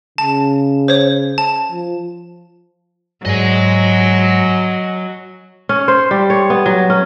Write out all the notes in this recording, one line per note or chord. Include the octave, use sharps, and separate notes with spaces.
C#3 A5
C5 C#5
A5
F3
G#2 F#3 D5 D#5 G#5
C#4
C5
G3
C#5
B3
F#3
C#4